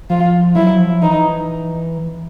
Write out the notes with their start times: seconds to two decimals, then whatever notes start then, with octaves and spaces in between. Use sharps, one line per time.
0.10 F3 F4
0.56 F#3 E4
0.79 F3
1.02 E3 D#4